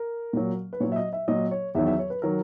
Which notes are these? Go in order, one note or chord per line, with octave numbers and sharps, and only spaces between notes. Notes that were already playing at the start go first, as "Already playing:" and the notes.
Already playing: A#4
A#2 F#3
B4
A#2 F#3 C#5
E5
D#5
E5
A#2 F#3 D#5
C#5
E2 D#3 F#3 E5
E5
C#5
B4
D#3 F#3 A#4